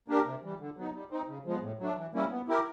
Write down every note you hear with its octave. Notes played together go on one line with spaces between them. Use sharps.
A#3 D4 G4 A#4
C3
E3 G3
D3
F#3 B3 D#4
G3
C4 D#4
C#3
F3 G#3 B3
A2
F#3 A3 D4
E3
G3 A#3 C#4 E4
B3
E4 G4 A#4